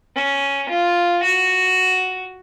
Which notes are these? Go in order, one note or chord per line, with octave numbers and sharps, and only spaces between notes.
C#4
F4
F#4